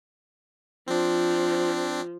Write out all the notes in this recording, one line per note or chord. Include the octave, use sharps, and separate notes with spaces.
F3 C4 D4